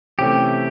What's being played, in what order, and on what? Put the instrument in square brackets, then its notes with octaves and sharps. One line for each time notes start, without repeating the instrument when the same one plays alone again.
[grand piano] C3 E3 A3 C#4 [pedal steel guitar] G4